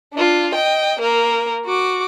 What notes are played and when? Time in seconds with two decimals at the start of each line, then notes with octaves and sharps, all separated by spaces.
0.14 D4 F4
0.55 D#5 G5
1.00 A#3 A#4
1.66 F#4 D6